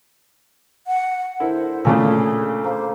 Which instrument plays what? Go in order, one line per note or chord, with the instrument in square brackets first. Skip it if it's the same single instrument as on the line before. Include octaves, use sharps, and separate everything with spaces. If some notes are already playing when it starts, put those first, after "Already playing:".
[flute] F#5
[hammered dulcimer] D3 [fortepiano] E4 A#4 [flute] C5
[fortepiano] A#2 C#3 A3 [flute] G#4 [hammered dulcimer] A4 D5
[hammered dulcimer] A#3 [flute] C5